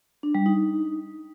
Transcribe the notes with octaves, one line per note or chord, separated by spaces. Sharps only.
D4
G3
D#4